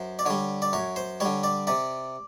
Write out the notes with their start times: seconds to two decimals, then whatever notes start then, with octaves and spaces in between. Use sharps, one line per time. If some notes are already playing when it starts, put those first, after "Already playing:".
Already playing: F#2 C5
0.19 D5
0.26 D3 G3 C#5
0.62 D5
0.73 F#2 C#5
0.96 C5
1.20 D3 G3 C#5
1.43 D5
1.67 C3 D5